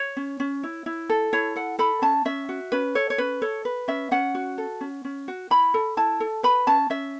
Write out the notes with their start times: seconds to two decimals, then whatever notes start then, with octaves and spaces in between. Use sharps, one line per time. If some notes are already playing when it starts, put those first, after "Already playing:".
Already playing: C#5
0.17 C#4
0.40 C#4
0.63 E4
0.86 E4
1.09 A4
1.33 E4 C#5
1.55 A4 F#5
1.79 A4 B5
2.02 C#4 A5
2.25 C#4 E5
2.49 F#4
2.72 C#4 B4
2.95 A4 C#5
3.10 C#5
3.18 C#4 B4
3.42 A4 C#5
3.65 B4
3.88 C#4 E5
4.11 C#4 F#5
4.35 F#4
4.58 A4
4.81 C#4
5.05 C#4
5.28 F#4
5.50 E4 B5
5.74 A4
5.97 E4 A5
6.20 A4
6.43 B4 B5
6.67 C#4 A5
6.90 C#4 E5